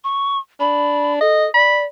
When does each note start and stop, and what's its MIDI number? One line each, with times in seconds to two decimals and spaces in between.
0.04 0.38 85
0.60 1.21 62
0.60 1.13 83
1.21 1.50 69
1.21 1.46 75
1.54 1.84 74
1.54 1.82 83